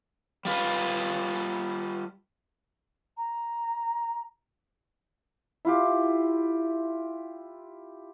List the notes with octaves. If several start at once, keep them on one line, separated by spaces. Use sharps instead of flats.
G3 F4 B4
A#5
E4 F4 G4